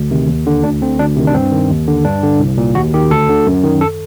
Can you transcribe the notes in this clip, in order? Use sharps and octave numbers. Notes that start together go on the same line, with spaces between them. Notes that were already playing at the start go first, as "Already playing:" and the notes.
Already playing: D2
C3 D#3
D#2
D3
D2 D4
D3 C4
D2 D4
C3 D#3
D4
G2 C4
D#3
D#2
D3
G2 D4
D3
C2
A#2
D#2 F#4
D#3 G4
D2 A4
D3
F#2
D#3
A4